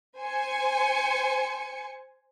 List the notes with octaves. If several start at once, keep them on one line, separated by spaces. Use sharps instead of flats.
C5 G#5 C#7